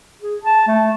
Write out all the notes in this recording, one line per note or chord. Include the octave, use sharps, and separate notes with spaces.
G#4
A5
A3